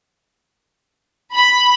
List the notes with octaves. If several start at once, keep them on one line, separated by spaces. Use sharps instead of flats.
B5